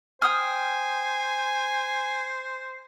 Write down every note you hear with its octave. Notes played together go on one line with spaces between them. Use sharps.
C5 G5 G#5 D#6 F6